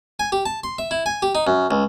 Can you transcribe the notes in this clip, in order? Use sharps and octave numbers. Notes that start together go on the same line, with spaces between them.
G#5
G4
A5
C6
E5
E4
G#5
G4
D#4
F#2
C#2